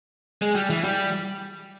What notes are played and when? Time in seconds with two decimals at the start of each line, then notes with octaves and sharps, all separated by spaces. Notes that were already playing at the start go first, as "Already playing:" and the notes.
0.42 G#3
0.55 G3
0.70 E3
0.84 G3